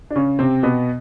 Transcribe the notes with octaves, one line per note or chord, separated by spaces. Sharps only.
D4
C#3 C#4
C3 C4
B2 B3